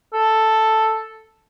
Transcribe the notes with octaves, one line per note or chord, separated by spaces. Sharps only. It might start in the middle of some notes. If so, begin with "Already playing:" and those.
A4